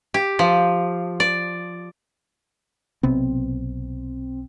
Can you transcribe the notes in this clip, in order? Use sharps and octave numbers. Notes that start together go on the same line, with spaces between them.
G4
F3
D5
B1 C3 B3 C4